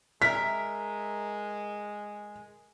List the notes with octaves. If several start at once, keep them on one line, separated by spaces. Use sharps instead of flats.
G#3 A#4 E5 B6